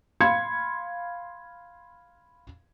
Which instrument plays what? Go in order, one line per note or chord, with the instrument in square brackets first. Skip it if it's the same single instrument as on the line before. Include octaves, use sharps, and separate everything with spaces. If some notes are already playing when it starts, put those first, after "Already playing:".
[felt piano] F5 B5 C6 G#6 C#7